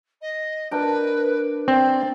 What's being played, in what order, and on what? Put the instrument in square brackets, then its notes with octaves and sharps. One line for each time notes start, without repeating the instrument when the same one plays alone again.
[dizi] D#5
[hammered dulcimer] D4 A#4 G5 [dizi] B4
[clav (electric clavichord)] C4 [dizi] D5